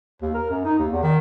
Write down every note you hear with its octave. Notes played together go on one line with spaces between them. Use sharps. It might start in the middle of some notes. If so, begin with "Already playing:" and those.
D#2
A#4
F#2
D#4
D#2
E2
D#3